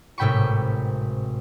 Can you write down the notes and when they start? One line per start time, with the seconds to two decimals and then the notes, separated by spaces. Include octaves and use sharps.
0.18 G#1 A2 C3 G5 B5 C#6